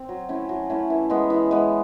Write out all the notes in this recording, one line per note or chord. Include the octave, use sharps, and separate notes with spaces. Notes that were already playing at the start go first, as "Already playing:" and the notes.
Already playing: C4
F#3
A3 C#4 E4
F#3
A3 C#4 E4
E3
G#3 B3
E3
G#3 B3